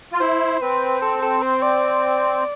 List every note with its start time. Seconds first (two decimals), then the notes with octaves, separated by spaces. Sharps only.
0.12 F4
0.20 E4 C5
0.62 C4 B4
1.02 A4
1.22 A4
1.43 C5
1.62 D5